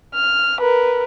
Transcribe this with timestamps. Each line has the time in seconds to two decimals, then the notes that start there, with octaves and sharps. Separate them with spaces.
0.15 F6
0.61 A#4 B4